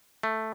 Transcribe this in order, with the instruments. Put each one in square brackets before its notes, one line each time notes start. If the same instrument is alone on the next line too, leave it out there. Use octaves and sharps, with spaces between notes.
[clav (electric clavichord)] A3